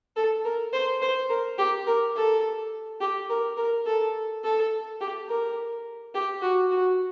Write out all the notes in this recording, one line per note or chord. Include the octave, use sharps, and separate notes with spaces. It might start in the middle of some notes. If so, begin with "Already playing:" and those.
A4
A#4
C5
C5
A#4
G4
A#4
A4
G4
A#4
A#4
A4
A4
G4
A#4
G4
F#4
F#4